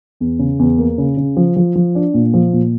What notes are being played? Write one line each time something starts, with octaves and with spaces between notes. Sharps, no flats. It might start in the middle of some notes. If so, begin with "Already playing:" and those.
E2
C#3
E2
A#3
C#3
C#3
F3
F3
F3
D4
A#2
F3
A#2